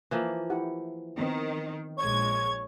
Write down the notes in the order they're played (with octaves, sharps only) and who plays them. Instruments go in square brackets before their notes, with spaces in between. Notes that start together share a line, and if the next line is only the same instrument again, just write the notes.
[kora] E3 F3 A#3
[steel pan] E4 G4 F#5
[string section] D#3 [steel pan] B3 C4
[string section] A#1 G#3 G#6 [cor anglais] C#5